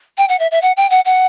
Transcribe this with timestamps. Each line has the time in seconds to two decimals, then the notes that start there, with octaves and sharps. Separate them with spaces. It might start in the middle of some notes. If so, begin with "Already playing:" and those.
0.18 G5
0.29 F#5
0.39 E5
0.51 E5
0.62 F#5
0.77 G5
0.90 F#5
1.05 F#5